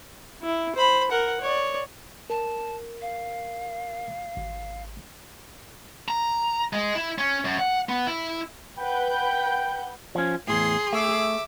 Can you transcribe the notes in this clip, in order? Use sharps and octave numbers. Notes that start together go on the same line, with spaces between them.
E4
C5 B5
A#4 F#5
C#5 D5
A#4 A5
F5
G#1
A#5
G#3
E4
C#4
F#2
F#5
B3
E4
B4 F#5 G5 G6
F3 C#4
E2 A2 G#4 C6
A3 E5 D6